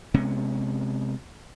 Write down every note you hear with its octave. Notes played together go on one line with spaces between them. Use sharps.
C3 G#3 B3 C#4